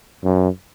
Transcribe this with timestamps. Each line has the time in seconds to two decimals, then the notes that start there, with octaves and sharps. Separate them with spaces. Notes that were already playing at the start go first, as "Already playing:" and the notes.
0.23 F#2